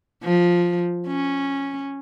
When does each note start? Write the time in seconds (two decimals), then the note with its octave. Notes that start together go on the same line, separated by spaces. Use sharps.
0.23 F3
1.07 C#4